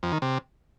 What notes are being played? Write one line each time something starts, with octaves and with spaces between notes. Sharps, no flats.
F2
D#3
C3